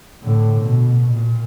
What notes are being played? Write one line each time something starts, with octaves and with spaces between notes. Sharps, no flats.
A2 D3
B2
A#2